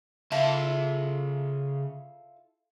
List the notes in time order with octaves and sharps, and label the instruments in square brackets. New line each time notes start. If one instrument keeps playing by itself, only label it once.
[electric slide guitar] C#3 A5 [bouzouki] E4 F4 A4